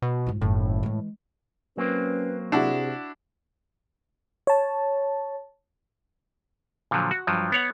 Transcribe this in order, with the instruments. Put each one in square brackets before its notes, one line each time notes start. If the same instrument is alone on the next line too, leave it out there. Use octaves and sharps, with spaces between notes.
[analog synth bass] B2
[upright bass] G#2 F4
[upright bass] F#1 D#3 [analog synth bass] A2
[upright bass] E3 G#3
[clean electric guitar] F#3 A#3 C4 [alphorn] C#4 [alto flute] B4
[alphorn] C3 [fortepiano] D4 E4 F#4 [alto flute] G#4
[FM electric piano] C#5 A5
[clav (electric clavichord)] A#2 D3 F3 F#3
F#4
G2 F3 F#3
B3 C#5 F#5